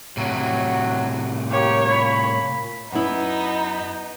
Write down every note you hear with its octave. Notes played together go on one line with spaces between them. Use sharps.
A2 C3 F#3
A#3 G4 C#5
A#2 B5
F#2 B3 D#4 E4 B4